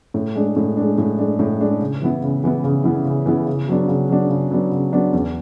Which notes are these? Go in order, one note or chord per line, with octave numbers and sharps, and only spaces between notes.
A2
G#3 D4
A2
G#3 D4
A2
G#3 D4
A2
G#3 D4
C#3
E3 B3 E4
C#3
E3 B3 E4
C#3
E3 B3 E4
C#3
E3 B3 E4
C#3
F#3 B3 D4
C#3
F#3 B3 D4
C#3
F#3 B3 D4
C#3
F#3 B3 D4
E2